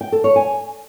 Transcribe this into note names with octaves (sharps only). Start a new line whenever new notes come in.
G5
A4
C#5
G#5